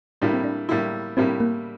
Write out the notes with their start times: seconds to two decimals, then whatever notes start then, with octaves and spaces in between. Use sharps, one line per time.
0.22 A2 G3 A#3 D4 E4
0.33 C4
0.44 D4
0.69 A2 G3 A#3 E4
1.17 A2 G3 A#3 C4 E4
1.40 A#3